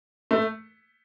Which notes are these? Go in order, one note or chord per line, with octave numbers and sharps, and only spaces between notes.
A3